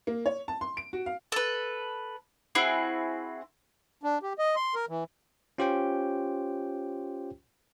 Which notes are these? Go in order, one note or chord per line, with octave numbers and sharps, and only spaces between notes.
A#3
C#5
A5
C6
D7
F#4
F5
A4 B4
C4 E4 F#4 G#4
D4
G4
D#5
C6
A#4
E3
C#4 F4 G4 C5 C#5 G5